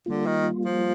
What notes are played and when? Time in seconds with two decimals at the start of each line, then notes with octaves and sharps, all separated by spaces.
0.06 D3 G3 A#3 F4
0.26 D#3
0.66 F3